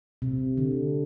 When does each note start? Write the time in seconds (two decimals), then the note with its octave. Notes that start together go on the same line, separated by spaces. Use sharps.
0.22 C3
0.57 D3